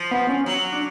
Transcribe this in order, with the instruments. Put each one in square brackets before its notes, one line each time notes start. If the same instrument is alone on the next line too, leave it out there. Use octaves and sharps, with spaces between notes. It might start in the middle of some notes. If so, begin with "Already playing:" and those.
Already playing: [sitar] F3
[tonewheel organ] B3
C#4
[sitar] F#3
[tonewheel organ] D4